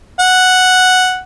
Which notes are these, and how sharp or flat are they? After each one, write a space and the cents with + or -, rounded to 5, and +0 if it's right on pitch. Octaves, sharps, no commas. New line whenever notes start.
F#5 +0